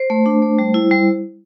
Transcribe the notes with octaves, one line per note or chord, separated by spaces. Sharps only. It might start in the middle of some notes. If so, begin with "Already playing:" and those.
Already playing: C5
A3
D4
A3
G3
E4
G3